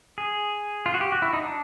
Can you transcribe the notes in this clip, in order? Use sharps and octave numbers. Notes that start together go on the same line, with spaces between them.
G#4
F4
F#4
G4
F#4
E4
D#4
D4